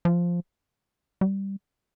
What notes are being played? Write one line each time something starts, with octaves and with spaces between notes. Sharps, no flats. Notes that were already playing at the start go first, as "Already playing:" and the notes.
F3
G3